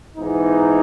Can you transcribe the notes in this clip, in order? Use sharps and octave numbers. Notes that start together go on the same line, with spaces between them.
G#2 E3 B3 D#4